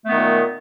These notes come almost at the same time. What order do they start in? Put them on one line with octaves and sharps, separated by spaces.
A3 B3 D#3 A#2